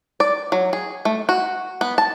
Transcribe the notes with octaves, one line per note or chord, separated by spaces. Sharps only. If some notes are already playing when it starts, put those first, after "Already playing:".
D5
F#3
G#4
A3
F#4
B3
A5